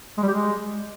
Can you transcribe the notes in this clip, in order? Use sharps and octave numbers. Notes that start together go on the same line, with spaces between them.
G#3
G3
G4
G#3